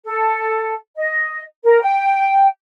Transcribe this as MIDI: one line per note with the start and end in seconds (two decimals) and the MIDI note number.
0.04 0.74 69
0.96 1.41 75
1.63 1.80 70
1.81 2.46 79